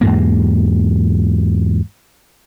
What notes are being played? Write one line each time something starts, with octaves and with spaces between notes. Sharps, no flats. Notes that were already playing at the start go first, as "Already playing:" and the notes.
E2 G#2 A#3